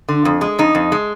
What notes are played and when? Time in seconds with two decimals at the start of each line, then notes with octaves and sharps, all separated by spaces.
0.09 D3
0.25 F2
0.41 G#3
0.59 F2 D#4
0.75 F2
0.92 G#3